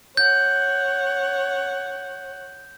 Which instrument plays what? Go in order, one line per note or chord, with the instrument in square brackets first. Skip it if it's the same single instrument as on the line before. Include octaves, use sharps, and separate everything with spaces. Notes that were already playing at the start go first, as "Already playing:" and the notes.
[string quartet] C#5 F#5 [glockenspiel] G6